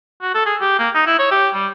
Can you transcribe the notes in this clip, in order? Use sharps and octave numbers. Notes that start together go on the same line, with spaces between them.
F#4
A4
G#4
G4
A#3
D#4
E4
C#5
G4
G3